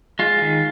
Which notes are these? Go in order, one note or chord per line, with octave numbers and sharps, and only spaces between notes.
G#3 F4
D#3